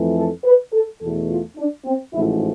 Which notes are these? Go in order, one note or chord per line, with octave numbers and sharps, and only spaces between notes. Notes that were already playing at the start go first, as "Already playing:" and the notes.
Already playing: F2 E3 A3
A4
B4
A4
E2 B2 A3 A4
F4
D4
C4
A1 G#2 F3 A3 E4